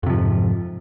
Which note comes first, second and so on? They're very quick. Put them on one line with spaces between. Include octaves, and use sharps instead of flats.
F2 C3 F3 G#2